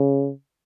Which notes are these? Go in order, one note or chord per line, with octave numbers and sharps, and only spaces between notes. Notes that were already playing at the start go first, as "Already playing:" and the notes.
Already playing: C#3